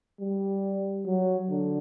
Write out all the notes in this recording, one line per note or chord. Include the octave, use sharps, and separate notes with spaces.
G3
F#3
D3